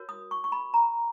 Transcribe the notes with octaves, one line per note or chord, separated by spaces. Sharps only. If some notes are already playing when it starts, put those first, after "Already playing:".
Already playing: F#4 A#4 C#5
D#6
C#6
C#6
B5
A#5